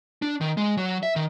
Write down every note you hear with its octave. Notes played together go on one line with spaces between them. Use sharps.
D4
D#3
G#3
F#3
E5
D#3